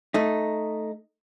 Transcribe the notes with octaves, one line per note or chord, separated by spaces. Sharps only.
A3 D#4